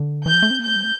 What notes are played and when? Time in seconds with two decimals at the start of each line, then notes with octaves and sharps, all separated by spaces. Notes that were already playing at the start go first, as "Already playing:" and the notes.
Already playing: D3
0.26 E3 G6
0.34 F3
0.42 A3
0.50 C4
0.59 A#3 G6
0.67 A3
0.76 G3
0.83 A3